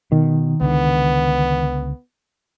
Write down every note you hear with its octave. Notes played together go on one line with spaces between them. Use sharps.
B2 D#3
C#2 D3 B3